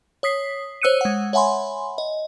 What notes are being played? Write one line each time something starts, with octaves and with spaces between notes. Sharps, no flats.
C#5 D#6 B6 C7
C5 C#5 E6 F#6 C#7 D#7
G#3 F#5
C#5 E5 F#5 G#5 B5 C6
D#5